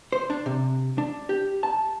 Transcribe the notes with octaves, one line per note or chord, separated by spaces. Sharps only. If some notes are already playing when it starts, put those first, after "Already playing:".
C5
D4
C3
D4
G4
A5